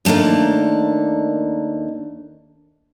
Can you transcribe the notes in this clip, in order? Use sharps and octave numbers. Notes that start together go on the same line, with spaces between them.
D#2 A3 A#3 D4 D#4